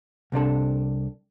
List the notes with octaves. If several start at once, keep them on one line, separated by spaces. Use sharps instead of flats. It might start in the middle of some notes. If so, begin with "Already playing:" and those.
C2 C3 D4 A4